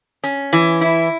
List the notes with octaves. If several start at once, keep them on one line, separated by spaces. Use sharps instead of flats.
C#4
E3
E4